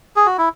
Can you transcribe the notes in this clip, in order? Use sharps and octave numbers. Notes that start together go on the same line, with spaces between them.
G#4
F#4
E4